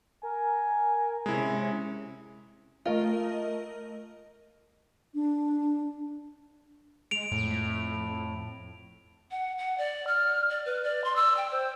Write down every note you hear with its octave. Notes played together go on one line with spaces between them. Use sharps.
A#4 G#5
C3 G#3 C#4 E4
A3 F4 A#4 D#5
D4
G#3 D7 F7
F2 A2
F#5
F#5
D5
F6
D5
B4
D5
C6
E6
G5
C5